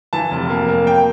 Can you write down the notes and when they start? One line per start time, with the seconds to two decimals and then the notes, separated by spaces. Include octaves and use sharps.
0.13 E3 A5
0.31 F1
0.50 A#3
0.68 A#3
0.87 G5